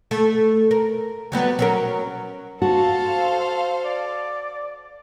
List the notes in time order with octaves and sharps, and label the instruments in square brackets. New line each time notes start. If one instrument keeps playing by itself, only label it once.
[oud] A3
A#4
F#3 G3 B3
F#3 C#4 A#4
[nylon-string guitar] F#4 [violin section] A4 C5 F5 [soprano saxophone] A5
[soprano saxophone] D5